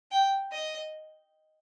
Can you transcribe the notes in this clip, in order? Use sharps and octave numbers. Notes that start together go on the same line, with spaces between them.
G5
D#5